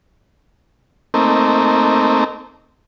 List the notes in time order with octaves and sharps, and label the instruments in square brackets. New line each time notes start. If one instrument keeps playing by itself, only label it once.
[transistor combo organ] A3 A#3 C4 D#4